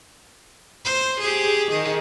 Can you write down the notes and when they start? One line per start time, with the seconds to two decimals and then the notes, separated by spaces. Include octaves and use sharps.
0.85 C5
1.21 G4 G#4
1.70 D#3 G#4